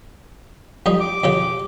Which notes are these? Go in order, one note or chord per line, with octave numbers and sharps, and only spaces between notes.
F2 G3 D#4
D6
F2 C#3 G4